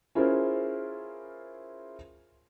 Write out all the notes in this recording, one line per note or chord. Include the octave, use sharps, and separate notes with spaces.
C#4 E4 F4 G#4 A#4 C5